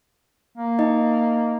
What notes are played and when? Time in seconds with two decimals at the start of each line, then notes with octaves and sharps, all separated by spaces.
0.58 A#3
0.79 D#4 D#5